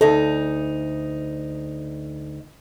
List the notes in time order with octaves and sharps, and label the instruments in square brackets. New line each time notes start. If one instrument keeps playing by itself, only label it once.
[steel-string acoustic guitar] D2 D#4 [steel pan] A4